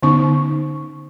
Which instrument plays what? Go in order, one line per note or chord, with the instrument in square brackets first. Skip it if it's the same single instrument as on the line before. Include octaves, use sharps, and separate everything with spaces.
[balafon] D3 B3 C#4 D#4 C#6